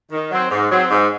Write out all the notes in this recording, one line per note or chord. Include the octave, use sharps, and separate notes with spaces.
D#3
F#3 C4
G#2
F#3 C4
G#2